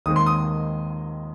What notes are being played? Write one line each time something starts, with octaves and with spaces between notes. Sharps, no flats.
D#2 D#3 G#3 C4 D#6
C6
D#6